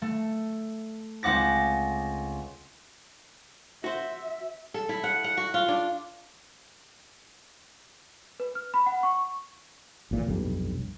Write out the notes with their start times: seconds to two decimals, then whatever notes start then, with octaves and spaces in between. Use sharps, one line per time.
0.02 A3
1.23 C#2 C4 F#5 D6 A#6
3.84 F#4 C5 E5
4.74 A4
4.89 E4
5.04 F#5
5.24 F#5
5.37 F#4
5.54 F4
5.68 D4
8.40 B4
8.55 F6
8.74 B5
8.86 F#5
9.03 C#6
10.11 A#1 A#2 E3
10.27 F1 B1 G2